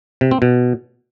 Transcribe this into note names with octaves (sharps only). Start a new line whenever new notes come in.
C3
C4
B2